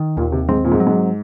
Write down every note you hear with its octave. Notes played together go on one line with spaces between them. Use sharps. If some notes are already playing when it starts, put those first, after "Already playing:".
Already playing: D#3
D#2 A#2
C3
G#2 C4
A#2
G#2
F#3
G#2